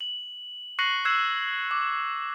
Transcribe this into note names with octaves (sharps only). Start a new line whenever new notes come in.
F#7
C#6 F#6 A#6 C7 C#7 F#7
E6 F#6 G#6 C7 E7
D6